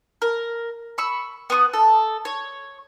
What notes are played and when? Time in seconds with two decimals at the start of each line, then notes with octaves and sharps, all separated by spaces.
0.22 A#4
0.98 B5 C#6 E6
1.50 B3 F#5 C#6 D#6
1.74 A4
2.25 C#5